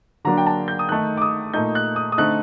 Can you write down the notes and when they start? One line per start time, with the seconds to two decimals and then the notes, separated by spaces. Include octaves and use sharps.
0.25 D3 F#3 A#3 D4 A#5
0.38 G5
0.47 A5
0.68 G6
0.79 D#6
0.89 D#3 A3 D#4 F#6
1.17 D6
1.22 D#6
1.54 A#2 A3 D#4 G6
1.75 F#6
1.96 D#6
2.12 D#6
2.18 D3 A3 C4 D#4 F#6